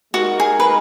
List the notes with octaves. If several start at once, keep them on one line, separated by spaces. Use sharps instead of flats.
G#3 D#4 F#4 A#4
G#4
B4